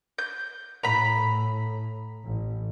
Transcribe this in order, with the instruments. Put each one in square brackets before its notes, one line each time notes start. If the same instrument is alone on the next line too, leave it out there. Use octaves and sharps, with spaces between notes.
[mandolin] G6
[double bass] A2 [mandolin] A#5 B5
[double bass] A1